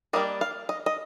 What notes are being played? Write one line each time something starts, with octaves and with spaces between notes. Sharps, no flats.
G3 A#3 D4 D#5
F5
D#5
D#5